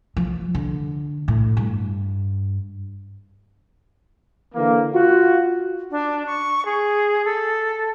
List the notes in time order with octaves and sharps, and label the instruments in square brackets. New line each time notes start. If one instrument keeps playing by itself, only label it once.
[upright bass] F3
D3
A2
G2
[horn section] D3 E3 A#3
F4 F#4
[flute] D4
C#6
G#4
A4